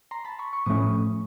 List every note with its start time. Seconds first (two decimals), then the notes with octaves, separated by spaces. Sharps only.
0.11 A#5 C6
0.25 A5 B5
0.39 B5 C#6
0.53 B5 C#6
0.66 A2 F3 A3 C#4 C#6 D#6